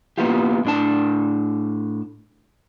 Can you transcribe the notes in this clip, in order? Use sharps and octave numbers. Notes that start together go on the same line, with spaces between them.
A#3 B3 E4 F4 G4
A2 D4 A5